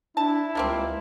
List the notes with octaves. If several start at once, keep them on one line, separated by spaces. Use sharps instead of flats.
D4 E4 A5
C#2 G3 A#3 C4